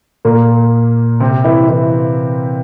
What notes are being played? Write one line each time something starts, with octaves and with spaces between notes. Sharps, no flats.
A#2 A#3
C3 C4
E3 E4
E3 E4